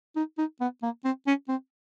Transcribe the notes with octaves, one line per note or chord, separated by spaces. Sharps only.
D#4
D#4
B3
A#3
C4
C#4
C4